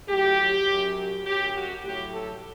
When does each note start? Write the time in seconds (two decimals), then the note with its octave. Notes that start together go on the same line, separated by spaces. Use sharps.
0.09 A2 F#3 G4
0.68 F#2 F#3
1.26 F#2 F#3 G4
1.55 F#4
1.85 A2 F#3 G4
2.14 A4